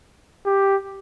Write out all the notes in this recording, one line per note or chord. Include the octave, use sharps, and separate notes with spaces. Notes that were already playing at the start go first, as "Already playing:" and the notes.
G4